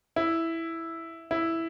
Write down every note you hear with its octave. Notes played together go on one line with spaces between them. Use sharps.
E4
E4